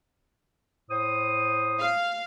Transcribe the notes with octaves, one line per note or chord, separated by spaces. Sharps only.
A2 C5 D#6
F5